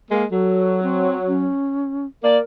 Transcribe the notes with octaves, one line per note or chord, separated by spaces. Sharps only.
G#3 A#3
F#3 A4
C4
C#4
A#3 A#4 D5